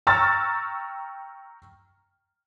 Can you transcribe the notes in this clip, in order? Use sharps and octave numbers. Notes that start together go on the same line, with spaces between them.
G5 A#5 C#6 E6 F6 A6